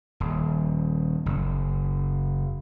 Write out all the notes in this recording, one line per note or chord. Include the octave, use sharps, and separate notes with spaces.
D#1
F#1